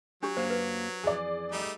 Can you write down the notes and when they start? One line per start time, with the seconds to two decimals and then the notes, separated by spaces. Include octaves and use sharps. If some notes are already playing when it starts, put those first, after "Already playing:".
0.23 F#3 D4 G4
0.37 F#2 A#3 C5 F5
0.50 B4
1.03 F2 E3 G#4 D5
1.52 G3 A3 D#4